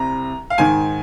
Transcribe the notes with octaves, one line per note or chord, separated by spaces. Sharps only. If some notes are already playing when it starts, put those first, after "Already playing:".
Already playing: C2 C3 A#5
F5
G#2 D#3 G#5